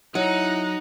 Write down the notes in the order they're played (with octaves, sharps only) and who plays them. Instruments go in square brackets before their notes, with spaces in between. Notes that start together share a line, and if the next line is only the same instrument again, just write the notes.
[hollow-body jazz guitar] F#3 [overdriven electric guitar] D#4 [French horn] E4 [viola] F#5 A#5